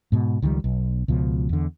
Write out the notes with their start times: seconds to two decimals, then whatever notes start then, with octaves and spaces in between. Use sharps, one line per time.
0.12 G#2 B2
0.42 C#2 D#3 F3 G3
0.64 B1
1.08 C#2 B2 F3
1.49 E2 D3